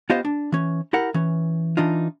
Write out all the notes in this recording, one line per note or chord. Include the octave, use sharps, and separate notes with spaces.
B3 F4 G4 C5 D#5 F5
D4
E3 C#4
E4 G4 A#4 F#5
E3 C#4
E3 D4 D#4 F4